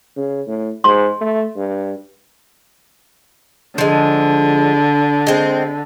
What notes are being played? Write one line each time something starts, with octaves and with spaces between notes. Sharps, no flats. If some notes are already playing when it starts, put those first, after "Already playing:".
C#3
A2
G#2 C6
A3
G2
D3 F3 G#3
G#3 C4